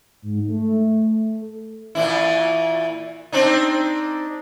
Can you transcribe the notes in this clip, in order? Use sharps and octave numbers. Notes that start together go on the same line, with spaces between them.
G#2
A3
A#2 E3 E4
C4 D4 D#4